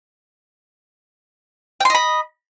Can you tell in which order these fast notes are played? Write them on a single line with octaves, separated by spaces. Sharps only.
G5 C6 D#5 B5